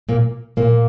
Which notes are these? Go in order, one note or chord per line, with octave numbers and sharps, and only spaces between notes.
A#2 A#3
A#2 A#3